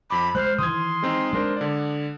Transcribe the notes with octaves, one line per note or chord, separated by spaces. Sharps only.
F2 B5 D6
G#3 C5 F6 F#6
D#3 E3 C6 D#6 G#6
G#3 C4 D#4
G#3 D4 A#4 C5
D3 D5